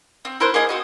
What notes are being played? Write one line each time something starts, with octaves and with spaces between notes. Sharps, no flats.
C4
E4 A#4 C5 F#6
A#3 G#4 D#5 C6
C4 F#4 D#5